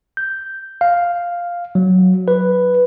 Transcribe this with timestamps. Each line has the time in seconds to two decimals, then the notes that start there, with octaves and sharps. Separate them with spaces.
0.17 G6
0.81 F5
1.75 F#3
2.28 B4